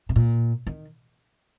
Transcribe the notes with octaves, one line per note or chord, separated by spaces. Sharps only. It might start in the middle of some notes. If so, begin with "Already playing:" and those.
C3
A#2
D#3